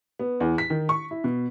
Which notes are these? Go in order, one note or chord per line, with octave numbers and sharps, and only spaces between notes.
B3
E2
B6
D#3
C#6
E4
B2